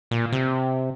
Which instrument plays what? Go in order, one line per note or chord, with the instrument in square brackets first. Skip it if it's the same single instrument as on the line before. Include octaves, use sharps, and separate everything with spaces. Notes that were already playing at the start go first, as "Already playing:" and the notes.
[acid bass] A#2
C3